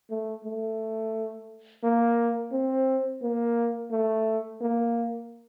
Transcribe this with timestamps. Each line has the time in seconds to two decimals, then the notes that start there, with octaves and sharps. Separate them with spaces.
0.10 A3
0.44 A3
1.84 A#3
2.52 C4
3.22 A#3
3.91 A3
4.61 A#3